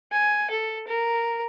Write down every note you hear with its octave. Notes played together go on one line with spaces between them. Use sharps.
G#5
A4
A#4